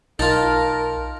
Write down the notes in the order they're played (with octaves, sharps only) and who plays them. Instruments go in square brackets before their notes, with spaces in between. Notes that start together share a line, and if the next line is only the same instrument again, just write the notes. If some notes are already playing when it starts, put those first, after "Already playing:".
[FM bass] B1 [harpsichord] D#4 F4 [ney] A#4 [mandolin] A5